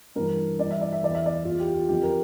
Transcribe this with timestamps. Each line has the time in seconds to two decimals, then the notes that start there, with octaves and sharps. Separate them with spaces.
0.16 G2 E3 A#4
0.59 G2 E3 D5
0.71 E5
0.81 D5
0.92 E5
1.03 E2 E3 D5
1.15 E5
1.26 D5
1.45 E2 E3 F4
1.60 G4
1.75 F4
1.89 F2 D3 F3 G4
2.03 A#4